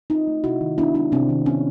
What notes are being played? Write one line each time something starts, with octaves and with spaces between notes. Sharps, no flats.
C4 D#4 F4
A3
C3 E4 F#4
D#3
B3 D4 E4
G#3 D4 E4
C3 C4 D4
D#3
B3 C#4